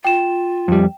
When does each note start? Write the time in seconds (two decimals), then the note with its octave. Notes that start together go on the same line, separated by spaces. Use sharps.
0.05 F4 G5 E7
0.68 F2 G3